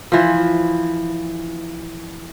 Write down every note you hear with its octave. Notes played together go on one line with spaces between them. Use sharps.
E3 F3